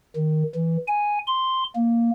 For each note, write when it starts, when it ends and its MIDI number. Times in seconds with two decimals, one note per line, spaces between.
0.16 0.43 51
0.55 0.77 52
0.88 1.19 80
1.27 1.64 84
1.76 2.11 58